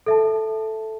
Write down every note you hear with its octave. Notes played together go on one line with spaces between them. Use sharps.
A4 E5 A5